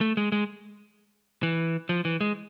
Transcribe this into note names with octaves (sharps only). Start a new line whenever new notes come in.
A3
G#3
G#3
E3
F3
E3
G#3